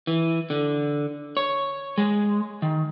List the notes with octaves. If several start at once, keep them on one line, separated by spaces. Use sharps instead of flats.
E3
D3
C#5
G#3
D#3